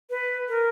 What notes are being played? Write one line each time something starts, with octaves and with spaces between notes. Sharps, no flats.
B4
A#4